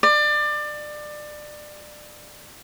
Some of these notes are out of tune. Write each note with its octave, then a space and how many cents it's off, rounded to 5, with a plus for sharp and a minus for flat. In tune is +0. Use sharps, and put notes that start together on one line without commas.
D5 +25